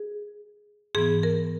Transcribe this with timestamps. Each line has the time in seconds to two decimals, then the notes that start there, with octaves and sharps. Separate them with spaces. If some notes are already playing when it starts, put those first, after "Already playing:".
Already playing: G#4
0.95 G#2 E3 B3 G#4
1.23 A#4